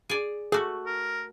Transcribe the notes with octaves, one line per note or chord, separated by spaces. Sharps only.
G#4 D5
A3 F#4 G#4 D6
A#4